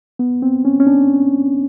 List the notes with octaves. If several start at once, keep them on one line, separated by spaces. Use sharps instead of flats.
B3
C4
C#4
C#4
D4